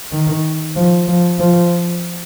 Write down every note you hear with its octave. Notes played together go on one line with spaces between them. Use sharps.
D#3
F3
F3
F3